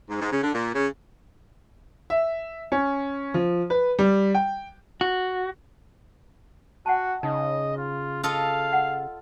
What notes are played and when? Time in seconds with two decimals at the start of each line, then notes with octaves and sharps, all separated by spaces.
0.09 G#2
0.20 G#2
0.31 C#3
0.43 D3
0.54 A#2
0.74 C#3
2.10 E5
2.72 C#4
3.34 F3
3.70 B4
3.99 G3
4.35 G5
5.01 F#4
6.86 F#4 F#5 G#5 A5
7.23 C#3 D#4 D#5
7.77 F4
8.24 F4 A4 D#5 F5
8.73 F#5